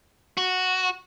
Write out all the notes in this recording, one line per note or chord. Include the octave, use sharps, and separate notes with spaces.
F#4